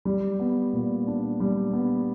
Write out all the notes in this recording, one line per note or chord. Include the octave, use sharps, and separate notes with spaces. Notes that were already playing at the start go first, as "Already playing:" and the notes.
G3
B3
A#2
D4
G3
B3